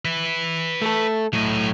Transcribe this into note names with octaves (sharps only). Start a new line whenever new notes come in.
B4 E5
A3 A4
A2 F#3 D#5